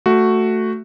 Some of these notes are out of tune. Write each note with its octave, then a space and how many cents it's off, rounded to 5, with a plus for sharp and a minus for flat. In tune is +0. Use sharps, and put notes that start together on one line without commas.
A3 +5 F#4 +0